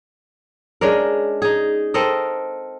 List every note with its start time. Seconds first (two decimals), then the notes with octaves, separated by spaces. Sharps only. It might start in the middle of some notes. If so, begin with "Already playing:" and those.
0.81 G#3 C#4 D4 A#4
1.42 D#4 G#4
1.94 C4 A4 A#4 D#5